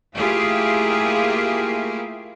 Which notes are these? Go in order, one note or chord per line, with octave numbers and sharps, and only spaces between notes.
A3 A#3 E4 F4 G4 G#4